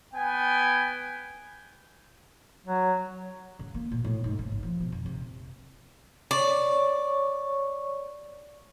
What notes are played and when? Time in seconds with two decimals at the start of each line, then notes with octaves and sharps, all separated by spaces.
0.14 B3 G5 G#5
2.66 F#3
3.59 C#3
3.74 A#3
3.91 A#2
4.04 A2
4.24 G#2
4.39 C#3
4.51 A1
4.63 F3
4.80 B2
4.92 F2
5.06 C3
6.31 C#5 D5 C#6